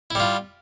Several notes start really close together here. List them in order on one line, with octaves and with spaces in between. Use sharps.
E4 G3 F4